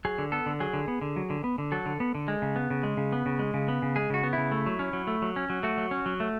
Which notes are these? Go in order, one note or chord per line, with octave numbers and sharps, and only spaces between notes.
F#3 G#4
D3
B3 A4
D3
F#3 G#4
D3
B3
D3
F#3
D3
B3
D3
F#3 A4
D3
B3
D3
G#3
C#3
B3
C#3
G#3
C#3
B3
C#3
G#3
C#3
B3
C#3
G#3 G#4
C#3 F#4
B3
C#3 E4
A3
F#3
C#4
F#3
A3
F#3
C#4
F#3
A3 F#4
F#3
C#4
F#3
A3